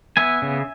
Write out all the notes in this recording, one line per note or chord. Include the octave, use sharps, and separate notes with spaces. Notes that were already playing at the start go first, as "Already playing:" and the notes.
B3 E5 G#5
C#3